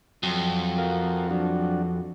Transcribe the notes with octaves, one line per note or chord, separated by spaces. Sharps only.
F2 F#3
F#4 A#4 F5
F#3 D4 F#4